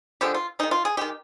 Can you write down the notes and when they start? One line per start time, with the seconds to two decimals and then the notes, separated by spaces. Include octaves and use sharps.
0.21 D3 F3 G#3 G4
0.34 F4
0.59 D#3 G#3 D#4
0.71 F4
0.85 G#4
0.97 D#3 G#3 G4